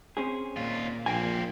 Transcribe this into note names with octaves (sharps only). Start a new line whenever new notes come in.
C4 C#4 G#4
D#2 A#2 F4
A#1 A#3 C4 G5 G#5